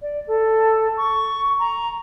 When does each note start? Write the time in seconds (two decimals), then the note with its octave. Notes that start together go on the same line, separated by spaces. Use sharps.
0.01 D5
0.27 A4
0.96 C#6
1.59 A#5